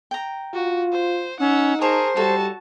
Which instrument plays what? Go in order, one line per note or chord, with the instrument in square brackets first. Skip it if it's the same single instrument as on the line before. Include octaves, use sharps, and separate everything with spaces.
[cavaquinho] G5 A#5
[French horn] F4 [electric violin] F#4
[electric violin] C5
[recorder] C#4 [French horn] D#4 [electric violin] F#5 E6
[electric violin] G#4 A#4 [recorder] C5 [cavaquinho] A5 A#5 C#6
[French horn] G3 [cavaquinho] E4 A4 C#5 [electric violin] F#4 A5